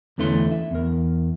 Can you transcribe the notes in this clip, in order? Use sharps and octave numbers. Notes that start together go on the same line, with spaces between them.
E2 D3 E3 A3 C#4 C6
E5
E2 A#4